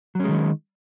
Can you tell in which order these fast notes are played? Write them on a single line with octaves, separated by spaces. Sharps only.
F#3 C#4 G#3 D#3